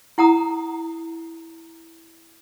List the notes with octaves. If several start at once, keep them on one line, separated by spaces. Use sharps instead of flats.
E4 F#5 A#5 D#6